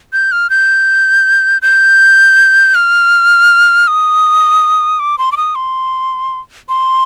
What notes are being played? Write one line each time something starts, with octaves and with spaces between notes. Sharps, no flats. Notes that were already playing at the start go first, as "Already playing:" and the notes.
G6
F6
G6
G6
F6
D#6
D6
C6
D6
D#6
C6
C6